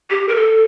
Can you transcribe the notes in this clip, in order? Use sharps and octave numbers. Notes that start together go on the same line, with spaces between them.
G4
A#4
A4